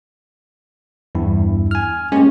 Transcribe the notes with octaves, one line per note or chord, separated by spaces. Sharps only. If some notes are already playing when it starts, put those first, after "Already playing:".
E2 G2 E4
G#5 F6
G#3 A#3 C#4 G4